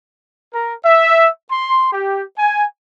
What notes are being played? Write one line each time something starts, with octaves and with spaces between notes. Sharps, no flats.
A#4
E5
C6
G4
G#5